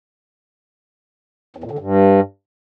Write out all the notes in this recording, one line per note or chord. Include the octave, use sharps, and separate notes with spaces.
E2
A#2
D3
G2